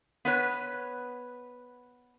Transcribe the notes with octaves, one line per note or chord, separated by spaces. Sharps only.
B3 B4 C#5